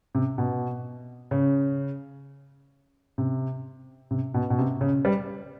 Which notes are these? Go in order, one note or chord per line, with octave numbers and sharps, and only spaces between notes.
C3
B2
C#3
C3
C3
B2
B2
C3
C#3
G3